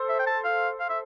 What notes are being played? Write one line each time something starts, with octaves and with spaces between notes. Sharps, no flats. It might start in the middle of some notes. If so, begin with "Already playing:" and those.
Already playing: A4 C5
E5
G5
A5
F5
F5
E5